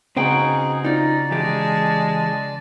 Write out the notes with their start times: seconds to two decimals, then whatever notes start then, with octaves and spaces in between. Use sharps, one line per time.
0.17 C#3 C4 D#4 F#4 G#4 B4 G5
0.84 D#4 F4 D5 A#5
1.31 E3 G#3 G4 A5